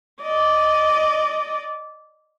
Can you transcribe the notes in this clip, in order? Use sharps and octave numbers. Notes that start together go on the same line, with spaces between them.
D5 D#5